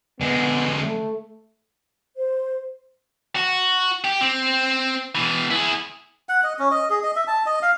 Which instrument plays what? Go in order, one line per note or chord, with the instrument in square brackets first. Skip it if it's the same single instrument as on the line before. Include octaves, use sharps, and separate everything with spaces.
[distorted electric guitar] D3 G#3 [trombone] B3
[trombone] A3
[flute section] C5
[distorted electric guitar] F#4
G4
C4
B2 E3
E4 G#4
[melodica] F#5
D#5
C#4
D#5
G#4
D#5
E5
A5
D#5
F5